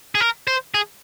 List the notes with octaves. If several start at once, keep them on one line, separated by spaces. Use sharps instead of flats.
G#4
A#4
C5
G#4